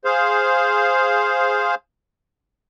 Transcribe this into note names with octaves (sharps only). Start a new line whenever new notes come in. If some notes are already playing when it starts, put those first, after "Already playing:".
G#4 C5 F5